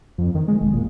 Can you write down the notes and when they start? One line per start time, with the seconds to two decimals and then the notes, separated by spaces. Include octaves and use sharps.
0.18 F2
0.35 D#3
0.48 G#3
0.61 E1
0.73 A#2